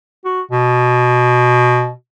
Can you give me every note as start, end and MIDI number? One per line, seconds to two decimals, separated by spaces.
0.25 0.41 66
0.51 1.91 47